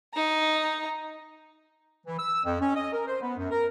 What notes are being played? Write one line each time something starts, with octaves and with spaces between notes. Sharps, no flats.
D#4 A#5
E3
E6
F2
C#4
D#5
A#4
C5
B3
F#2
A#4